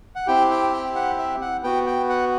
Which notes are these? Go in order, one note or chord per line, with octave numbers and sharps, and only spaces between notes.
F#5
C4 E4 G4 G5
G5
G5
F#5
E5
F#5
B3 F#4 G5
G5
F#5